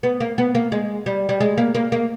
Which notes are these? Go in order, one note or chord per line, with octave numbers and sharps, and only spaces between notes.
B3
A#3
B3
A#3
G#3
G3
G3
G#3
A#3
A#3
A#3